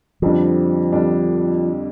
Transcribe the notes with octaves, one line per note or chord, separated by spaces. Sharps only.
F2 D3 F3 G3 D4
F2 D3 G3 D4